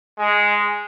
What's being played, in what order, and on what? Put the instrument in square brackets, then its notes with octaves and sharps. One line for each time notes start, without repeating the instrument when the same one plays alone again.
[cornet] G#3